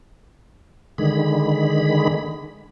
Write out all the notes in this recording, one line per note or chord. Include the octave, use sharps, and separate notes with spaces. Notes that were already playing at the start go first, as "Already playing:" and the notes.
D3 D#3 G#3 B5